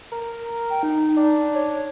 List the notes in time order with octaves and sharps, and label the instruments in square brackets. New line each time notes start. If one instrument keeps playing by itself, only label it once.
[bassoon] A#4
[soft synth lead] G5
D#4
[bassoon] D4
[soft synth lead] C#5